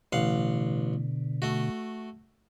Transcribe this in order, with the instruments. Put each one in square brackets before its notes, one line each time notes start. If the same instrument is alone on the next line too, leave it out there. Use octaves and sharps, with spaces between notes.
[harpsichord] A1 F5 F#5 [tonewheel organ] B2 D3
[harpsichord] A3 F#4